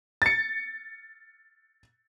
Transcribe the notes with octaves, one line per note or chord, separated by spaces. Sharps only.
A6 C#7